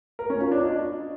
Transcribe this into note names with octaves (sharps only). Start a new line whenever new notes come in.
A#4
C#4
F4
D4
D#5